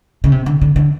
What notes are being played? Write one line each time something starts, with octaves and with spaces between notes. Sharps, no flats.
C#3
C3
D3
D3
D3